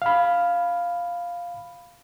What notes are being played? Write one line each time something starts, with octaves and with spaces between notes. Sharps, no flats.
F5 B5